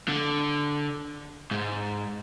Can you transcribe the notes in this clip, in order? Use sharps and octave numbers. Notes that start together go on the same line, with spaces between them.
D3
G#2